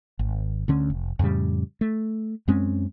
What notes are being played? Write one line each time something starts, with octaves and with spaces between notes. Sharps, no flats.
G#1
D2 D3 C#4
F1
F2 A2 C#3 G3
A3
F#2 G#3 C4 C#4